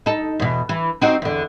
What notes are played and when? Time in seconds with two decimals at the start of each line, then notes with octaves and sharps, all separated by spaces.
0.06 D#4 A4
0.40 E2 B2
0.69 E3
1.01 C4 D#4 F#4
1.22 E2 D3